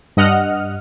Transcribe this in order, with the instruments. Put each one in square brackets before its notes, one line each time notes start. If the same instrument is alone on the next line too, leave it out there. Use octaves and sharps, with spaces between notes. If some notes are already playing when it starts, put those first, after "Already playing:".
[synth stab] G2 D#5 F#5 F6